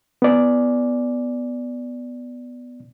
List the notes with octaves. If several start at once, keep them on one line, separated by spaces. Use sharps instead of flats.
B3 D5